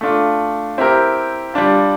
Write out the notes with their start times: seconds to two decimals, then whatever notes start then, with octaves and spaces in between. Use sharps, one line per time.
0.01 A3 D4 F4
0.78 C4 E4 G4 A#4
1.54 G3 D4 F4